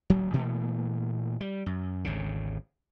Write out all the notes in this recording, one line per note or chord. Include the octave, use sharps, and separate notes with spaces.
D1 A#1 F#3
A#2 E3 A3 A#3
G3
F#2
G#1 D2 C#3